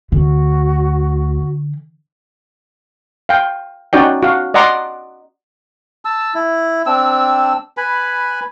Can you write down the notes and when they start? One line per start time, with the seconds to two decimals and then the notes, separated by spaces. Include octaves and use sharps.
0.12 D2 D3 F#4
3.29 F5 G5
3.93 C#4 D#4 F#4 D5 G5
4.22 F#4 F5
4.54 D5 D#5 F#5 A#5 C6 D6
6.05 A5 E6
6.34 E4
6.86 C4 D4 E6
7.77 B4 G#5 B5